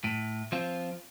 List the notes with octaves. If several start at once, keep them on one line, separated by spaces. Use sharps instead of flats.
A2
F3 C4 F4